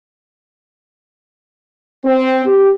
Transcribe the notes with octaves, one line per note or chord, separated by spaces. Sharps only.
C4
G4